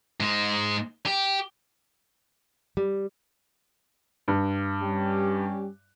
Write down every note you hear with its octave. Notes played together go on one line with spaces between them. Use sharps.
G#2 G#3
G4
G3
G2
G3 C#4 G4